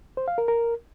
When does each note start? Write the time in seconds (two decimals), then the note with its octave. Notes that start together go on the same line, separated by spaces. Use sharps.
0.17 C5
0.28 F5
0.38 A#4
0.48 A#4